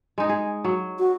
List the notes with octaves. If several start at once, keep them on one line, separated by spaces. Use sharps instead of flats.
G#3 D#4
G#4
F#3
F#4